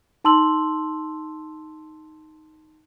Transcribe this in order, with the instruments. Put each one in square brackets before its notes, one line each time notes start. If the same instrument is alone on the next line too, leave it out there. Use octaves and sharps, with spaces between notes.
[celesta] D#4 A5 C6 E6 F#7